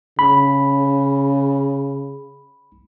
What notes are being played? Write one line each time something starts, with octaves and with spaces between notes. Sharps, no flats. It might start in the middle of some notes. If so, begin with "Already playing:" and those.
C#3 B5